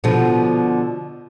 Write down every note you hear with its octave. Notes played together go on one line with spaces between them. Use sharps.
B2 D3 F3